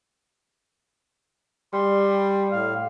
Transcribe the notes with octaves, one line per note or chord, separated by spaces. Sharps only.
G3 C6
A2 F5